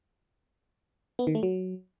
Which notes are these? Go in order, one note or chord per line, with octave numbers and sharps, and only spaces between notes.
B3
D#3
A3
F#3